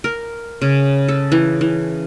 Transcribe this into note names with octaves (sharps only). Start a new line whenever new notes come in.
A#4
C#3
A4
E3
E3